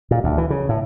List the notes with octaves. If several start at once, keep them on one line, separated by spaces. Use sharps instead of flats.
A#2
D2
E3
C#3
A2